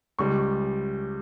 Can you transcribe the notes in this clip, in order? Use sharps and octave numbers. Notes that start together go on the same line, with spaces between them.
C#2 C#3 G3 C#6